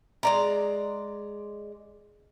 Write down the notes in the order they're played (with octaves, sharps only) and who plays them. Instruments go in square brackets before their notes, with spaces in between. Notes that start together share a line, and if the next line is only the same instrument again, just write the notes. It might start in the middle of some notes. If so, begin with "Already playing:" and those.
[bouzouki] G#3 D5 A#5